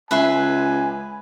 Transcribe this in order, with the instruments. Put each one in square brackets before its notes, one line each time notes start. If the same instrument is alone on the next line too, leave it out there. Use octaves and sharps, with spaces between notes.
[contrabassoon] C#2 [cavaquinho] B4 E5 C6 [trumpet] G#5